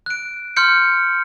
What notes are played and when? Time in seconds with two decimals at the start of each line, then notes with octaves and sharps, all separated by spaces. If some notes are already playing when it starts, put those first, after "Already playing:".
0.06 F#6 D7
0.56 C6 F6 G6 C#7